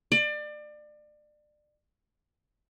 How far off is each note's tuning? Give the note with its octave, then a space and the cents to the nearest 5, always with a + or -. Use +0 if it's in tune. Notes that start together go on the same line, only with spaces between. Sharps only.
D5 +30